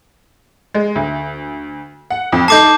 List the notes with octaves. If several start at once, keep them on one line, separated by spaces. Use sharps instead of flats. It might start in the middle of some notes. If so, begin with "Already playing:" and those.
G#3
D2
F#5
F2
D#4 A4 A5 D6 G6 C7